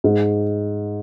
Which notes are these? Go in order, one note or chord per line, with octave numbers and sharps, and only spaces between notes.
G#2